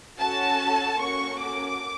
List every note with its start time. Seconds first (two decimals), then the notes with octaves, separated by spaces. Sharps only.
0.19 C#4 F#4 A4 A5
1.00 A#3 C#4 F#4 A4 C#6
1.40 D6